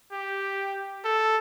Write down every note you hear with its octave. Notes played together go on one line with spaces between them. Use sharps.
G4
A4